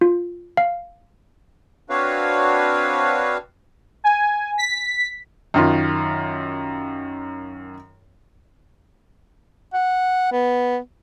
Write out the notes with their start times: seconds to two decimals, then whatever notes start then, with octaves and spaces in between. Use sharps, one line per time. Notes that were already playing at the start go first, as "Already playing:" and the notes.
0.01 F4
0.57 F5
1.90 C4 D4 F#4 B4 C#5 F5
4.04 G#5
4.58 B6
5.54 F#2 D#3 F4
9.74 F#5
10.32 B3